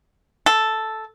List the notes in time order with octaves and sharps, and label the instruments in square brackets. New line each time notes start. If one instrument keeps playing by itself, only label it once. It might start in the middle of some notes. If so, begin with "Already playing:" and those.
[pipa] A4